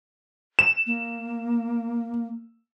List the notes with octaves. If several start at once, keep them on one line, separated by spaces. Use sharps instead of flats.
E7
A#3